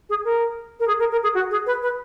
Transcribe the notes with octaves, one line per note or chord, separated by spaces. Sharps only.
G#4
A#4
A#4
G#4
A#4
A#4
G#4
F#4
G#4
B4
B4